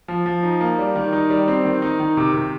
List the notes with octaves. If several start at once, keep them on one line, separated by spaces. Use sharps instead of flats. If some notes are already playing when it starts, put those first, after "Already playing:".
F3
F3
D#4
A#3
G3
D#3
D#4
G3
C4
D#3
D#4
D#3
C3
C3